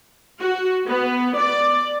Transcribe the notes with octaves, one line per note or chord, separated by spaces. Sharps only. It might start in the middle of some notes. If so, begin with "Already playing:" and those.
F#4
B3
D5